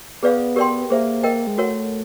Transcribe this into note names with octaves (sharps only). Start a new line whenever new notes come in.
B3 G#4 B4 D5 F5
G4 A#4 D5 G5 C6
A#3 G#4 C5 E5
A#4 D#5 G5
G#3
A3 F#4 A#4 C#5 F#5